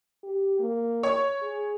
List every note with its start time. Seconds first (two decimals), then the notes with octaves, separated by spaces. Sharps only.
0.23 G4
0.60 A#3
1.03 C#5
1.42 G#4